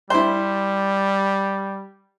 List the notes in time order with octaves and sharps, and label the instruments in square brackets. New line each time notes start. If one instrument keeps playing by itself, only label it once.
[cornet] G3 [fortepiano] E4 C5